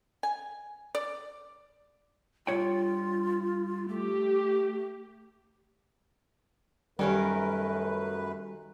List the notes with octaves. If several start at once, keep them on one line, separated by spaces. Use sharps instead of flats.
G#5
D5
G2 F4 C#5 G5
A3 G4
F#2 D#3 G3 A3 C#4 A#4 B4